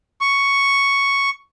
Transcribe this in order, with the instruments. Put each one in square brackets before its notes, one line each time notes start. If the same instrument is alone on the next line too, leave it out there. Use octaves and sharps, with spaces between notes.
[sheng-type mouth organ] C#6